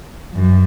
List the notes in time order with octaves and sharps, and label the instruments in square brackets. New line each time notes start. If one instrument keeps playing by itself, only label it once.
[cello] F#2